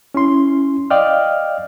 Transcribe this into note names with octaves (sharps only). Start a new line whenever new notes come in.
C#4 E4 C6
D5 D#5 F5 G5 F6